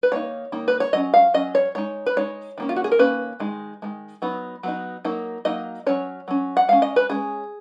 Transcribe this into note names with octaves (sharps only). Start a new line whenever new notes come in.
B4
D#3 A#3 D#4 C#5
D#3 A#3 D#4
B4
C#5
F#3 C#4 D#5
F5
F#3 C#4 D#5
C#5
G#3 D#4 C#5
B4
G#3 D#4 C#5
D#3 A#3 C#4
F4
F#4
G#4
A#4
D#3 A#3 C#4 B4
D#3 G#3 D#4
D#3 G#3
F#3 B3 D#4
F#3 B3 D#4
F#3 A#3 D#4
F#3 A#3 D#4 D#5
F#3 C#4 C#5
F#3 C#4
F#5
G#3 C#4 F5
D#5
B4
G#3 C#4 G#4